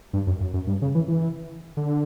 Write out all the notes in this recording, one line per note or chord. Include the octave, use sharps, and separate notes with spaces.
G2
F#2
F#2
F#2
G2
C#3
E3
E3
D3